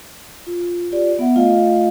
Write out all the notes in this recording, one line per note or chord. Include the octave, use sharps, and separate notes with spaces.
F4
F4 G4 D5
B3 E5 F#5
A3 F4 D#5 F5